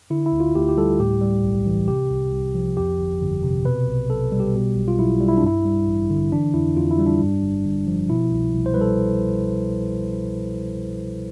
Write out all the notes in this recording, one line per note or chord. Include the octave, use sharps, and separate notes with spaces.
D3 E4
E4
D2
F4
D2 G4
G4
G3 A4
A2 G4
G3
B1
E3
C3 G4
C2
C2
F3
F2 G4
G1
G1
C3
B2 B4
B1
B1 A4
G3
G4
B2
B1
F4
B1 E4
G3
E4
D4
G2 E4
G3
A1
D3
E3 D4
F2 E4
F2 F4
E4
G3
D4
G2
G1
G1
F3
B2 E4
C2
C2
C5
G3 B4
A4